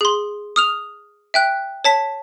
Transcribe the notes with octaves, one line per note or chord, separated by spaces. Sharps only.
G#4 C6
D#6 F6 F7
E5 G5 F#6
C#5 A5 B6